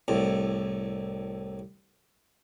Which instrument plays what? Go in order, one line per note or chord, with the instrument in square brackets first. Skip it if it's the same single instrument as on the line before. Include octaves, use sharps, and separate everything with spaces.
[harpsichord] C2 A2